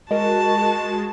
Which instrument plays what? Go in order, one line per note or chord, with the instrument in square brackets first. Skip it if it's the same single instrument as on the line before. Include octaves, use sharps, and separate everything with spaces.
[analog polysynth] G#3 [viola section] F#4 [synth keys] A#4 D#5 [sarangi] A5